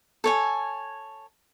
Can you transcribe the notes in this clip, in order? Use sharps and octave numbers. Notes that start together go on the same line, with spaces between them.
A4 C#5 G#5